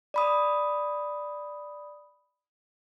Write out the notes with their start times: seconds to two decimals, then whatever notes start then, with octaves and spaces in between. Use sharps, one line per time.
0.14 D5 B5 D#6